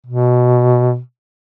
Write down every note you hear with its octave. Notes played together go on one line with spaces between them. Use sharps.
B2